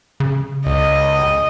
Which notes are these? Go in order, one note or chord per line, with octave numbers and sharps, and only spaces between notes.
C#3
C#2 D#5